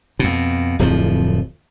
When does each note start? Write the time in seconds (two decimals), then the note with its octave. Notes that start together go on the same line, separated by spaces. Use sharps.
0.19 F2 B2
0.79 D1 F2 F3